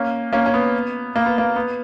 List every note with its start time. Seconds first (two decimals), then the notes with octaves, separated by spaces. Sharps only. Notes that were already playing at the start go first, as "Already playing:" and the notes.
Already playing: A#3 C#4
0.33 A#3 C#4
0.46 C#4
0.54 B3
1.16 A#3
1.26 B3
1.38 A#3
1.56 B3